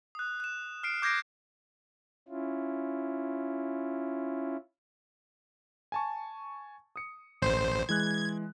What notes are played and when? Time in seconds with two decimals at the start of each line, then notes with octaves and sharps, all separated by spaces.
0.15 D#6 F#6
0.40 F#6 E7
0.83 F6 C7 D7
1.02 D6 G6 G#6 A#6 C7 D7
2.28 C#4 E4 F4
5.92 G#5 A5 C#6
6.96 D#6 C#7
7.42 A1 C5
7.89 E3 G#3 F#6 G#6